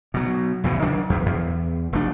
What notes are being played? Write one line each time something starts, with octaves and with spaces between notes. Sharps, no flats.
B2 F#3
B1 E2 A2 C#3
D#3 F#3 D4
E2
E2
F1 A3 D4